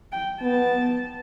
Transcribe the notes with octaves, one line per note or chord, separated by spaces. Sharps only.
G5
B3 A5